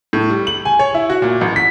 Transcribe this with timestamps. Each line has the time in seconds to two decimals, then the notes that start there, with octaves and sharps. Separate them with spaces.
0.13 A2
0.30 G3
0.47 F#7
0.65 G#5
0.79 C#5
0.94 E4
1.10 F#4
1.22 A#2
1.41 A1
1.56 B6